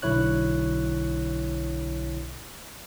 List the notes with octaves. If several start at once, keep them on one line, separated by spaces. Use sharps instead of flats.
B1 D3 E4 C#5 F#6